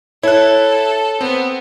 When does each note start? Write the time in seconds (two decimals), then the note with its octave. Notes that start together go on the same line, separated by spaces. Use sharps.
0.23 E4 A4 C#5 F#6
1.21 B3 C4